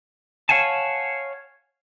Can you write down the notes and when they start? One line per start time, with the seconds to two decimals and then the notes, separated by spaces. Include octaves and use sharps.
0.49 C#5 F5 F#5 G#5 A5